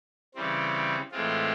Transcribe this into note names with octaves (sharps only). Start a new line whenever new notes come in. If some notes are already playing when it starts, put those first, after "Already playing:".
C#3 E3 G3 C4
A2 E3 G#3 C4 F4